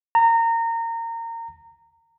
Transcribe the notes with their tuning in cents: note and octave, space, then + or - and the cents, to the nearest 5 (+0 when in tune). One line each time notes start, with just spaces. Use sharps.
A#5 -25